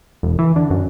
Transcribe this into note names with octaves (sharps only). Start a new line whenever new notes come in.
E1
E3
D3
F#2